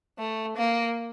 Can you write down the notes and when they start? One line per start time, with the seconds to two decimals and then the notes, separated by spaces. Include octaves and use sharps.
0.18 A3
0.57 A#3